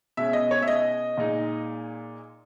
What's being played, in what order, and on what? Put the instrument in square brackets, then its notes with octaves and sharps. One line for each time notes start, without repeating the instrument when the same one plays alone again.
[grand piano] B2 G#3 C#4 E5
D#5
C#5
E5
D#5
A#2 G#3 D#4